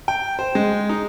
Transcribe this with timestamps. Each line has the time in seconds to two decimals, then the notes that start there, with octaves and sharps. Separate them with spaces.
0.08 G5
0.39 C5
0.55 G#3
0.89 D#4